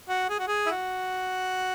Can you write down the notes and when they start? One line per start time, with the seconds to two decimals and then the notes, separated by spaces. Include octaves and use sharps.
0.09 F#4
0.30 G#4
0.39 F#4
0.48 G#4
0.66 E4
0.71 F#4